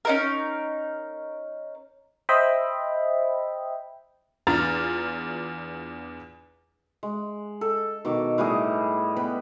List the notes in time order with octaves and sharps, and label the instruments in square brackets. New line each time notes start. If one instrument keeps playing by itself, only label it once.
[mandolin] C#4 D#4 A#4
[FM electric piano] C5 D#5 E5 G5 B5
[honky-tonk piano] E2 D4 F4 A#5 A6
[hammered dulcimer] G#3
A4
B2 D#3 D6
A2 G3 G#4 D#5
B3 B4 G5